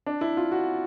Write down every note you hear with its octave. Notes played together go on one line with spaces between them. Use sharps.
D4
E4
F4
F#4